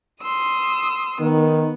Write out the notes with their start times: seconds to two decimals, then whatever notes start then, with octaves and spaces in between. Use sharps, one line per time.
0.22 C6 D#6 E6
1.21 D#3 B3